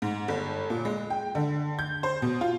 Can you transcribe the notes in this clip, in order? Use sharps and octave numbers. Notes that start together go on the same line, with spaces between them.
G#2
G1
A#2
G#3
G5
D3
G6
C5
B2
F4